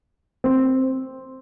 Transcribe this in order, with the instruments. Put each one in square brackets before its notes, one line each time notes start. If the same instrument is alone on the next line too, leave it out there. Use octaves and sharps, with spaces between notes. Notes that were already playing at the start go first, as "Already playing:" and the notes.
[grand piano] C4